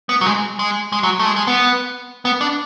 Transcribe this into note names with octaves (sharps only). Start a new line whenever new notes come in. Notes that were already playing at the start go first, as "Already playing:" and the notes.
B3
F#3
G#3
G#3
G#3
F#3
A3
G#3
G#3
B3
B3
D4